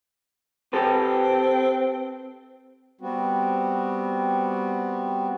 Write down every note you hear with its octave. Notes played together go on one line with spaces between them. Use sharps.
C4 G4 A4 B4
G3 B3 C4 F#4